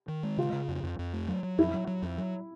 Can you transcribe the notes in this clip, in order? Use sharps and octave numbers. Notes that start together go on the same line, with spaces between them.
D#3
G#3
C#3 F4
C#3
F2
F2
F2
A3
F#3
F#3
F2 E4
F#3
F#3
F2
F#3